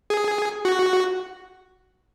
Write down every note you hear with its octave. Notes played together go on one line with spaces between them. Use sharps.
G#4
F#4